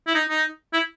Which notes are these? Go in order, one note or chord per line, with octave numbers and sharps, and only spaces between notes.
E4
D#4
D#4
E4